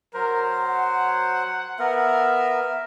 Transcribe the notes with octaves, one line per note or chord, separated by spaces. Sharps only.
F#3 A#4 C5
F#5
B3 A#4 E5